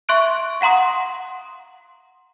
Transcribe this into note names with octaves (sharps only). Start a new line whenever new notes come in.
E5 C6 C#6 F#6 D7
F5 F#5 A#5 C6 D#6